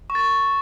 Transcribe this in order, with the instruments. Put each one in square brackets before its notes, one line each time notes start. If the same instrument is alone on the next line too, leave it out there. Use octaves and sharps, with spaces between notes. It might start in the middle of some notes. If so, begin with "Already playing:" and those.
[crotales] C#6
A6
C#6